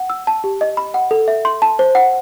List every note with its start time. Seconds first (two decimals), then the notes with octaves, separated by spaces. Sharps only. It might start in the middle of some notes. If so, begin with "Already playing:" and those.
Already playing: F#5
0.10 E6
0.27 A5
0.44 G4
0.61 D#5
0.77 B5
0.94 F#5
1.11 A4
1.28 E5
1.45 C6
1.62 A5
1.79 C5
1.95 F#5